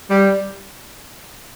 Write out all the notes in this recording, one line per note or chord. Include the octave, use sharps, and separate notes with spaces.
G3